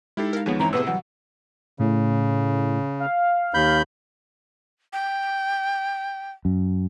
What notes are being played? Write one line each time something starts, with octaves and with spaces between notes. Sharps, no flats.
G#3 D#4 E4 G4 A4
A#4 F5
D#2 F3 B3 G#4 B4 C#5
G1 E3 C4 C#4 E4 C#5 A#5
A2 C3 A3 B3 G#4 B4 E6
E3 F#3 G3 F#5
A2 C#3
F5
D#2 B5 G6
G5
F#2